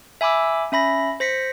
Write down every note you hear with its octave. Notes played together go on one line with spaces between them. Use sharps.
E5 G#5 B5 D6 E6
C#4 E5 B5 A#6
C5 A#6 B6 C#7